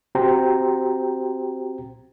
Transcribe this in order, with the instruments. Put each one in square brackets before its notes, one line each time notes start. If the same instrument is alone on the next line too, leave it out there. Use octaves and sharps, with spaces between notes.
[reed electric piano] C4 F#4 G4 C5 G5 A#5